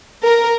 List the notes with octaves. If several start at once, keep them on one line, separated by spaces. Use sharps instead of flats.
A#4